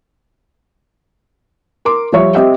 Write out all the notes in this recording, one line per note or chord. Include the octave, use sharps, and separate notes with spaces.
A#4 C6 D6
F3 G3 F4 C#5 E5 C#6
C4 G4 D#5 E5 G5